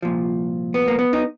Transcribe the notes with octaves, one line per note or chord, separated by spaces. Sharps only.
C2 A#2 F3
B3
A#3
B3
D#4